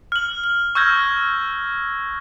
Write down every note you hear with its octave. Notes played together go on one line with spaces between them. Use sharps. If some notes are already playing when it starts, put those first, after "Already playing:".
F6 F#7
F#7
C#6 E6 F6 G6 G#6 A#6